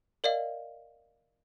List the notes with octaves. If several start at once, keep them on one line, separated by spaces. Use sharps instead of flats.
A#4 D5 D#5 F5